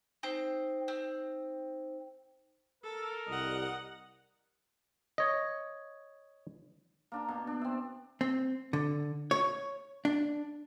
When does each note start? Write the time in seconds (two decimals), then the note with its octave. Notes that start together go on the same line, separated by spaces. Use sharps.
0.23 C4 D#4 C5
0.88 C4
2.84 A4 A#4
3.28 C2 G3 D#5 F#5
5.18 C#5 D#5
7.12 A#3 D4 A#5
7.28 B2
7.47 D4
7.61 C4 E5
8.21 C4
8.73 D3
9.31 C#5
10.05 D4